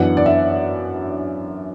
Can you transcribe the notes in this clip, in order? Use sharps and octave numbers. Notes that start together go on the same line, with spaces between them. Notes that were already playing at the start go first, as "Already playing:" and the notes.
Already playing: F#2 E3 B3 D4 F#5
D5
E5